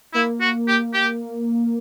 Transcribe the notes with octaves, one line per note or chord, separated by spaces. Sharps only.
A#3 E4
F#4
G4
G4